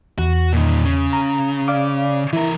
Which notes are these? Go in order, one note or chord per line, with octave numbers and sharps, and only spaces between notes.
E2 F#4
A#2 D#3
C#3
A#5
D5 F5 D6
E3 E4 A#4